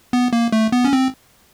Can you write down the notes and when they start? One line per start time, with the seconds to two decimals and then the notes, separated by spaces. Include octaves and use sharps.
0.13 B3
0.33 A#3
0.52 A3
0.72 B3
0.84 C#4
0.93 C4